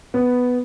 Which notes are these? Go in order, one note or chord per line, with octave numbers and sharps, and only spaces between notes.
B3